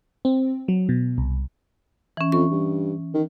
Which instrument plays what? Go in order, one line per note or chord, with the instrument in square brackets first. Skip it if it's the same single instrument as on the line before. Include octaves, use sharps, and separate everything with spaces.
[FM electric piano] C4
F#3
B2
C2
[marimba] E3 C#4
[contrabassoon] F2 [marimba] C#6
[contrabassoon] G2
D#3